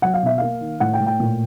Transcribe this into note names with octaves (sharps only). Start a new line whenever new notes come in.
F#3 F#5
F5
B2 E5
A#3 F5
D#3
A2 F#5
G5
A2
G5
A#2